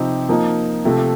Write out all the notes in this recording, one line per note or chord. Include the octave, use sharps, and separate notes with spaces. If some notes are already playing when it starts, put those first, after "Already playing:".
Already playing: C3 F3 C4 D#4 G4
F3 A#3 D#4
C3 F3 A3